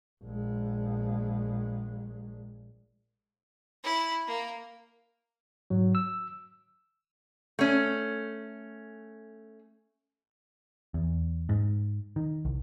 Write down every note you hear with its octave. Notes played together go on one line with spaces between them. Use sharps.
A#1 G#3
E4
A#3
G#2 F#3
E6
A3 C#4
E2
G#2
D#3
C2